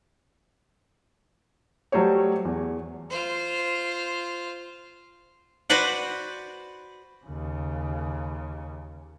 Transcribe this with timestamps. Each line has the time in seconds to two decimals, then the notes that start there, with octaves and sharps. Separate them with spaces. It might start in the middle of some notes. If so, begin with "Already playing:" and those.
1.92 F#3 G3 A3 C5 C#5
2.45 E2
3.10 F4 C5
5.70 F#4 B4 C5 D5 F#5
7.25 D#2 C#3